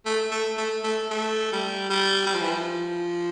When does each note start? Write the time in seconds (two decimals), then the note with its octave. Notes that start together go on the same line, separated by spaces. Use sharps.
0.06 A3
0.31 A3
0.58 A3
0.84 A3
1.11 A3
1.53 G3
1.90 G3
2.26 G3
2.34 F3
2.42 E3
2.50 F3